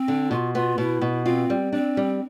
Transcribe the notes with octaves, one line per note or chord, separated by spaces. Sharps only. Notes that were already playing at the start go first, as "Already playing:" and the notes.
Already playing: C4
D3
B2 F4
B3 F4
B2 E4
B2
C4 F4
G3
C4 D4
G3